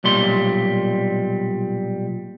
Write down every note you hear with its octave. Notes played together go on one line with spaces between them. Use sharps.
B1 A#2 G3 C6